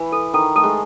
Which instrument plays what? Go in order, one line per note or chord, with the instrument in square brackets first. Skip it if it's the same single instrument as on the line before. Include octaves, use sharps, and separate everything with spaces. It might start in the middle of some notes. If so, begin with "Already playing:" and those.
Already playing: [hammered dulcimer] E3 [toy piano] B5
[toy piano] A4
[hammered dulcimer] D#3 [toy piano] A4
[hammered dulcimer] A3 [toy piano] A4
[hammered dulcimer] G#3